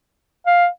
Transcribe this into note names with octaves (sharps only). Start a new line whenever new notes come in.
F5